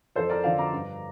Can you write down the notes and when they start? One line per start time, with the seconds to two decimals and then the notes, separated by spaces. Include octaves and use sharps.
0.16 F2 A4 C5
0.30 A#4 D5
0.44 D3 F3 D5 F5
0.58 A#5 D6
0.73 G2